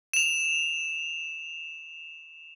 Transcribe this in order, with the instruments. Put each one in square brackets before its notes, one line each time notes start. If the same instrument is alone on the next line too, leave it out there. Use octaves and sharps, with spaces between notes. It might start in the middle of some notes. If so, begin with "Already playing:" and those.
[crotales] E7 F7